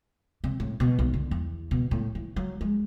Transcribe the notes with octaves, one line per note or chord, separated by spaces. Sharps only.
C3
A2
B2
B1
D3
E2
B2
A2
E3
F#3
G#3